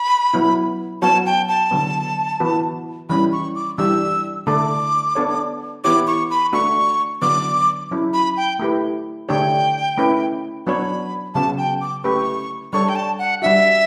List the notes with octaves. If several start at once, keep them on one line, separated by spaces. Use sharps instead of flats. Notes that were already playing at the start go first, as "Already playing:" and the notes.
Already playing: B5
F#3 B3 E4
F#3 B3 F#4 C#5 A5
G5
A5
D3 F#3 B3
E3 B3 F#4 B4
E3 G3 C#4 B5
C#6
D6
E3 G3 D4 G4 E6
D3 A3 D4 A4 D6
B3 D4 A4 C#5
E3 B3 E4 G4 C#5 D6
C#6
B5
A3 D4 F#4 C#6
D3 F#3 B3 D4 D6
F#3 C#4 E4
B5
G5
A3 E4 G4 B4
D3 A3 D4 G4 C#5 G5
A3 C#4 E4 B4
F#3 B3 D4 F#4 C#5 B5
C#3 F#3 B3 F#4 A5
G5
D6
A3 C#4 G4 B4 C#6
G3 D4 A4 C#5 C#6
G5
A5
F#5
G3 D4 F#4 E5